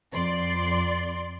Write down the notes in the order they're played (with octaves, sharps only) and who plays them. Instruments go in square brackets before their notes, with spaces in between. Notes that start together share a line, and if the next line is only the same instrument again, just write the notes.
[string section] F2 D5 C6